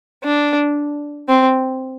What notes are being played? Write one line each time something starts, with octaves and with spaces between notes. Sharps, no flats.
D4
C4